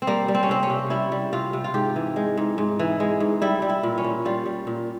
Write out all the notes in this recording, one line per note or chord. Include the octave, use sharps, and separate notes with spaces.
C4
G3 A#3
G3
C4
C#4
C3 C4
C#4
C3
G3 E4
G3
C3 F4
C3
F4
G#2 G4
E3
G#3
G#2
G#2
E3
G#3
G#2
G3 E4
G3
E4
A#2
C#4
A#2
G3 F4
G3
A#2